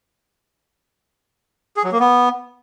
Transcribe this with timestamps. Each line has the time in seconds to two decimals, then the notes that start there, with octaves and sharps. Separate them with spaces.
1.77 G#4
1.84 F#3
1.92 A#3
2.00 B3